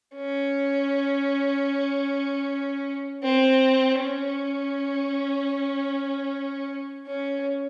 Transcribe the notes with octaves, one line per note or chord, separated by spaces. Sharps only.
C#4
C4
C#4
C#4